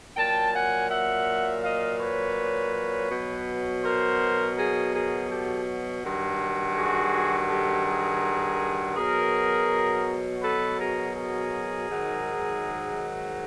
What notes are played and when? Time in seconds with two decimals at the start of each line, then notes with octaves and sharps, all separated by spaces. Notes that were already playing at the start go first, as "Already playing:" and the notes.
0.17 A#2 F#3 G5 A5
0.54 F#5 G#5
0.90 E5 F#5
1.64 D#5 F5
2.00 B4 C#5
3.10 B2 F#3
3.83 A#4 C5
4.56 G#4 A#4
4.93 G#4 A#4
5.30 G4 A4
6.03 G2 D#3 F#3
6.77 F#4 G#4
7.49 G4 A4
7.86 G#4 A#4
8.96 B2 F#3 G#4 A#4
10.42 A4 B4
10.79 G#4 A#4
11.16 G#4 A#4
11.89 G#2 D#3 F#3